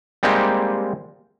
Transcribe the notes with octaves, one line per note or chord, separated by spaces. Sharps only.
G3 G#3 A#3 C4 D#4 G4